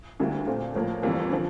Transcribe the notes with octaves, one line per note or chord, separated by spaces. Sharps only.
D2 D3 G3 A#3 E4
A#2 A3 C4
A2 F3 A#3
G1 F2 E3 G3 A#3
D3 F3